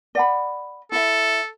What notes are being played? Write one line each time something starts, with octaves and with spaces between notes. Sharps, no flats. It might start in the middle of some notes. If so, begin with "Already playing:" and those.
D5 F#5 B5
E4 A4 E5